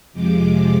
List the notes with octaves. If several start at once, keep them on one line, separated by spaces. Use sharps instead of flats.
F2 C3 F3 G#3 D6